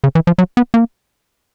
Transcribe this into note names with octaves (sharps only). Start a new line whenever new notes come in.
C#3
E3
F3
F#3
B3
A#3